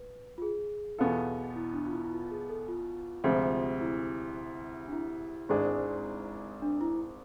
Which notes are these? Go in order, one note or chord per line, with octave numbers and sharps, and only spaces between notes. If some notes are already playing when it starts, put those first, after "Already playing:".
Already playing: B4
F4
G#4
E2 B2 B3 F4 A4
E4
D4
F4
E4
E4
F4
F4
G#4
A4
F4
D2 C3 F3 G#3
E4
D4
E4
G#1 G#2 G#3 D4 G#4
D4
E4